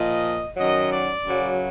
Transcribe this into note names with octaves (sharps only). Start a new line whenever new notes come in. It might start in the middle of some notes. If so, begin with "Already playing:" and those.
Already playing: A#2 F3 D#5
F#2 D#3 F#3 D#5
D5
F#2 C#3 F#3